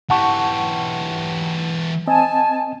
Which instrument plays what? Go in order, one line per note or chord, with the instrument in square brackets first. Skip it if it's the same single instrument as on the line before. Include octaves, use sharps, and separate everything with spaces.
[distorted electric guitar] E3 G4 [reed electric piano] F#5 A5 C#6
[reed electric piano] C4 D#5 [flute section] G#5 A5